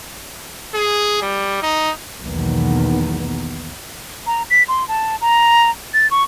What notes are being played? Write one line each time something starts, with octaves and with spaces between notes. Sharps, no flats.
G#4
G3
D#4
B1 E2 D#3 A#3 B3
A#5
B6
C6
A5
A#5
A6
C#6